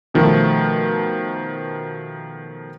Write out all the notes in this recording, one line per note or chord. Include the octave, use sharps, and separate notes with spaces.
B2 D#3 F3 A3